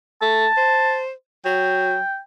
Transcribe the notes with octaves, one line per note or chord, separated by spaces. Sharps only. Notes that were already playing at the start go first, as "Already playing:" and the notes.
A3 A5
C5
F#3 G5